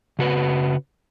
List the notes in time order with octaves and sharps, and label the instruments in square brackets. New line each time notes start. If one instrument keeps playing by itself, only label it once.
[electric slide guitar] C#3 F#4 B4